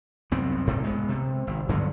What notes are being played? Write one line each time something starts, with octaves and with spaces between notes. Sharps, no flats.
C2 F#2 B3 C4
C2 G#2 C3 A3
G#3 B3
C3
G#1
G2 D3 F#3 B3